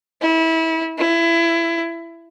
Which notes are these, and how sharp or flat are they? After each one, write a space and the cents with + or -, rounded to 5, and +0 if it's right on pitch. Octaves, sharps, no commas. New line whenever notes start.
E4 -25
E4 +20